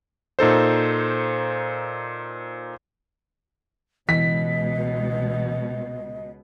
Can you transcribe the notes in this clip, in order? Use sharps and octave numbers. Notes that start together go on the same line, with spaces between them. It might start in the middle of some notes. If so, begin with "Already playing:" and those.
A#2 D#4 A4 C5
C#2 B2 E3 D#5 B6